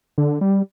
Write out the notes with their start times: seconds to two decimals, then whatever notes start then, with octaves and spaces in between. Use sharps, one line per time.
0.18 D3
0.41 G3